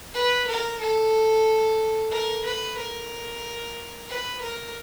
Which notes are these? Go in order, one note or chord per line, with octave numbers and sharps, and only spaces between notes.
B4
A#4
A4
A#4
B4
A#4
B4
A#4